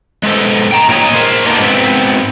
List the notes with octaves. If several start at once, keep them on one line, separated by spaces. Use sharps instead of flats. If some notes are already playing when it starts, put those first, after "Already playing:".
G#3 B3 A4 C5
G5 A#5
A#2 D4 D#4 C#5 D#5
A#4 C5
A#3 B3 D4 D#4
G#2 B3 C4